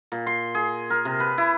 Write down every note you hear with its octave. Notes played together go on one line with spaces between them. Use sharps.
A#2
C6
G#4
A#4
C3
B4
E4